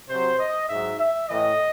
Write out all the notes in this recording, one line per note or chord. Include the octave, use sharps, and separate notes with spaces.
C3 F#3 C5
D#5
G#2 F#3 E5
E5
A2 E3 D#5